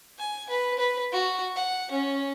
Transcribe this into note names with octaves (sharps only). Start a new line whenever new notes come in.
G#5
B4
B4
F#4
F#5
C#4